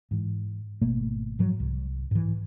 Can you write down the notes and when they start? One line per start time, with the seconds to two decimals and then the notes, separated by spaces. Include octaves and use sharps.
0.11 G#2 E3
0.81 G#1 B2 A3 A#3
1.39 G#2 F3 F#3
1.60 C2
2.11 G#2 E3